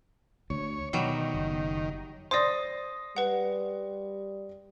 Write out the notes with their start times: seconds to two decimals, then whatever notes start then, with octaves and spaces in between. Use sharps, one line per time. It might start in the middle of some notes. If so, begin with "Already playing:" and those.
0.50 D2 C#5
0.93 B2 D#3 F#3 G3
1.34 F#1
2.31 C5 D5 C6 D#6 A#6
3.16 G3 B4 F#5